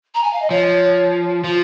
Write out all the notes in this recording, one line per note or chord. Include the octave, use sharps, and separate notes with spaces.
A#5
G#5
F5
D#5
F3 C#5
F3 F4